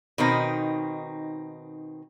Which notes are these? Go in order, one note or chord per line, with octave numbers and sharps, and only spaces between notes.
B2 D#3 C4 D#4